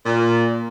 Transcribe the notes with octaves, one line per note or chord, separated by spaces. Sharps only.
A#2